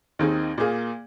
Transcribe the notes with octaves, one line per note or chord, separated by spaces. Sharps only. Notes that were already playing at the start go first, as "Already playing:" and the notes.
D#2 D#3 C4 D#4 G#4
A#2 A#3 G#4